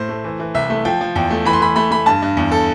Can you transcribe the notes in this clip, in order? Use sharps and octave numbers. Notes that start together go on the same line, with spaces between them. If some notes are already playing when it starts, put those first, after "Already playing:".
Already playing: A2 C5
A3
E3
E3
C2 E5
A3
F3 G5
F3
E2 G5
A3
E3 B5
C6
E3 B5
A3 B5
A3 B5
G2 A5
G2
E2
A4